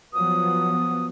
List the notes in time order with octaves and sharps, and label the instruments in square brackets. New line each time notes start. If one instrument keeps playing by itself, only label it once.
[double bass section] F3 F#3 B3 [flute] D#6